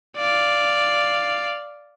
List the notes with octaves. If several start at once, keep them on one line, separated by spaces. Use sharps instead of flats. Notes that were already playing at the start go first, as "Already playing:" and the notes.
D5 F5